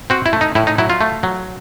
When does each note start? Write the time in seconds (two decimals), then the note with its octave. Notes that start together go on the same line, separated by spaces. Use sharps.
0.10 C4 F#4
0.26 E4
0.33 A3
0.41 D#4
0.55 A2 E4
0.67 D#4
0.78 F#3 E4
0.90 F4
1.01 A3
1.23 F#3